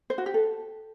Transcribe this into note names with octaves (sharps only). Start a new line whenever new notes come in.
C5
F#4
G4
A4